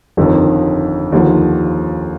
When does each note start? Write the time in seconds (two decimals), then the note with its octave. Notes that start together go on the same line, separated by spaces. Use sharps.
0.17 G1 F2 D#3
1.12 D#2 D3 F3